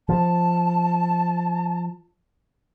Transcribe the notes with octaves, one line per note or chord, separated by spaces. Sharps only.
F3 A5